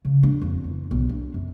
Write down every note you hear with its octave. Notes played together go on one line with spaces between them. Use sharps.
C#3
D4
F2
E2
B1
D4
F#2